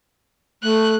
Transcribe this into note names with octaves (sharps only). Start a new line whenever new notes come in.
A3 F#6